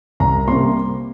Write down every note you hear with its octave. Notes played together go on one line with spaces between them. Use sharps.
C2 A#5
C3 G3 A#3 C6